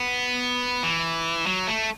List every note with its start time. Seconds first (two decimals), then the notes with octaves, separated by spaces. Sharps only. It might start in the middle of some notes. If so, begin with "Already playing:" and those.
Already playing: B3
0.83 E3
1.46 F#3
1.67 A3